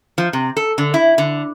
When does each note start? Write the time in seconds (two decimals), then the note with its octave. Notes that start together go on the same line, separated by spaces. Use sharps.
0.18 F3
0.33 C3
0.57 A4
0.78 D3
0.94 E4
1.18 D3